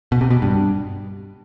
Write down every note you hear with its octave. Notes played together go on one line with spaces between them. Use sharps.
B2
C3
B2
G2